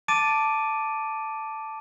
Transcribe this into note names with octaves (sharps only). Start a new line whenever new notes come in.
A5 D6 A6 D7 D#7